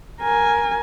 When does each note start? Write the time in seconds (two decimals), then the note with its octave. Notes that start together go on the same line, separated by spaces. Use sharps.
0.21 A#4 G#5